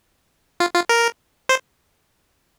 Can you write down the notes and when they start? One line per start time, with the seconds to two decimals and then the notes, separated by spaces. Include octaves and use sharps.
0.60 F4
0.75 F4
0.89 A#4
1.49 C5